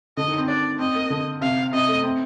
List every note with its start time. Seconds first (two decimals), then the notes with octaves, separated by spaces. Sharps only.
0.17 D3 D#5
0.28 D#3
0.38 C4
0.48 D4 D5
0.79 C4 D#5
0.95 A#3
1.10 D3
1.41 C3 F5
1.72 C3 D#5
1.88 A3
2.03 C4